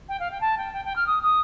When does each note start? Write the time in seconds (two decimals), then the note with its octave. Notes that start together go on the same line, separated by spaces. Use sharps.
0.08 G5
0.19 F5
0.31 G5
0.41 A5
0.57 G5
0.73 G5
0.84 G5
0.95 F6
1.06 D#6
1.22 D#6